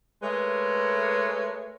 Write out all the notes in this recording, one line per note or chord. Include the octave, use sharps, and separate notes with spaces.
G#3 A3 A#4 B4 C#5